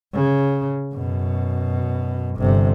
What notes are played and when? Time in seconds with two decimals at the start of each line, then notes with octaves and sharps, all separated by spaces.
0.13 C#3
0.94 F#2 B2
2.37 G1 C3